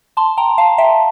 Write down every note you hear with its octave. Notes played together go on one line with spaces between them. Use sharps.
A5 C6
G5 A#5
F5 A5
E5 G5